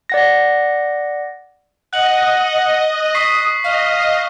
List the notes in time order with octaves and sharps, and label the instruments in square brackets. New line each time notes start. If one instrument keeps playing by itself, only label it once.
[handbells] D5 F#5 A#6
[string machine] D#5 [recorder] F#5 [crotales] F#6 F#7
[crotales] C#6 B6 C7 [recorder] D#6
[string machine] D#5 [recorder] F5